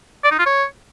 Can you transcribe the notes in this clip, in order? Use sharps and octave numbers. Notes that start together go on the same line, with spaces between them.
D5
D#4
F4
C#5